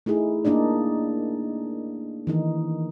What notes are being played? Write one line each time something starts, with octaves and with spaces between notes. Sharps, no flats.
A3 D#4 E4 G#4
A#3 D4 D#4 D5
D#3 E3 D#4